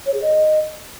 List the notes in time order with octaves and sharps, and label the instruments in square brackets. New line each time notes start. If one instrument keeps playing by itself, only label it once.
[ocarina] C#5
G#4
D#5